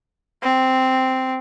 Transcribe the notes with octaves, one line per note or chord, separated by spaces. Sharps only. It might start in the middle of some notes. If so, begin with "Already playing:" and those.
C4